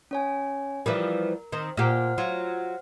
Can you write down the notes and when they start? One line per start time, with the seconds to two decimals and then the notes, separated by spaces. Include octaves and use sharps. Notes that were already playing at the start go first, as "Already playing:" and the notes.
0.11 C#4 C#5 G#5
0.86 E3 F3 G3 A#4
1.52 D#3 C4
1.77 A#2 G4 C5 F#5 F6
2.18 F#3 F4